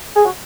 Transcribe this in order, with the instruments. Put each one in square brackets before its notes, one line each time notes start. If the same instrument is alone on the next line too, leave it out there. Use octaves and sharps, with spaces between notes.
[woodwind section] G#4
F#4